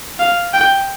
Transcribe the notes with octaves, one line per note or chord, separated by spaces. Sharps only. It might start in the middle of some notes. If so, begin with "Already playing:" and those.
F5
G5